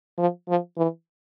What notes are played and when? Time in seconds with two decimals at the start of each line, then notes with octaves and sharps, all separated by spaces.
0.18 F3
0.48 F3
0.78 E3